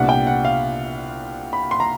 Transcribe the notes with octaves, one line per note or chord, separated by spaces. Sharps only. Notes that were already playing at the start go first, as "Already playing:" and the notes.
Already playing: C2 A#2 G3 B3 D4 F#5
G5
F#5
F5
B5
C6
A#5